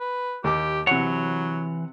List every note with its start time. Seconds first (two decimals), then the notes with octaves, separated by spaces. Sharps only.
0.01 B4
0.44 D#2 G4 D6
0.87 C3 E3 F#3 C#5 F#5